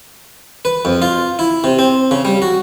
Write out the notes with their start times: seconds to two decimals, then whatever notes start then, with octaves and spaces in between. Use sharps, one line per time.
0.65 B4
0.85 F2
1.02 F4
1.39 E4
1.64 C3
1.79 C4
2.11 C#3
2.25 G3
2.42 F#4